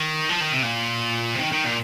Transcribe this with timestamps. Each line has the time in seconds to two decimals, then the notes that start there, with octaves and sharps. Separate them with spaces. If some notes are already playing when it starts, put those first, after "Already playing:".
Already playing: D#3
0.30 F3
0.41 D#3
0.52 C3
0.63 A#2
1.35 C3
1.40 D#3
1.52 D#3
1.65 A#2